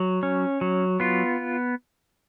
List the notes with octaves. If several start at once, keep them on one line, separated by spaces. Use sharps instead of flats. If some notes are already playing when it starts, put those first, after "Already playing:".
Already playing: F#3
C#4
F#3
B3 F4